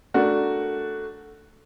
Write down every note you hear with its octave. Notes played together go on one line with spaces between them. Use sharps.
A3 D4 F#4 A#4